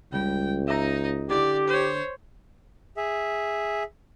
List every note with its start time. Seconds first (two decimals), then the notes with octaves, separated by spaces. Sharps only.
0.13 C#2 C#3 G3 G5
0.68 D#4 D#5 E5 A#5
1.30 D3 E4 G4 D5
1.68 C5 C#5
2.97 G#4 E5